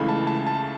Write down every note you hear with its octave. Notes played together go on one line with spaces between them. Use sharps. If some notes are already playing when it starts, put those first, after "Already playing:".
Already playing: C#2 C#3 E3 A3 B5
A5
A5
A5